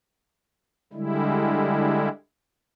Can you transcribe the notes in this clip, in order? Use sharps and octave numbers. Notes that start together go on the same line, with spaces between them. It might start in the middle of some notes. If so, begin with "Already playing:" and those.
D3 G3 G#3 E4